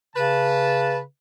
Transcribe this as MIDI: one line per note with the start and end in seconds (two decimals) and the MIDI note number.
0.16 1.03 49
0.16 0.98 71
0.16 0.98 81